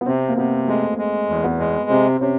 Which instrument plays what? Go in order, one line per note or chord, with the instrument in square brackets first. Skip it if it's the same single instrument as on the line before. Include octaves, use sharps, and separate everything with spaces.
[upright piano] B3
[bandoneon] C3 [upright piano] C4
[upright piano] A#3
[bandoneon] C3 [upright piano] B3
[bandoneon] G#3 [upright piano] A3
[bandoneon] G#3
E2
[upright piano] B3
[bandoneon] G#3
[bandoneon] C3 [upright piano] C4
[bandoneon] C3 [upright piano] C#4